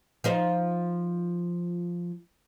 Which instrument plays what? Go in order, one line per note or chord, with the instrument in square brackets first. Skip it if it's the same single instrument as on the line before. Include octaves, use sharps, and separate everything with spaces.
[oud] F3 D#4 C5